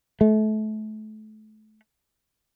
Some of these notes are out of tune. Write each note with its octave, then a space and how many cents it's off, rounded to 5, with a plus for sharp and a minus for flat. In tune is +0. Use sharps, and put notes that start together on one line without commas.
A3 -30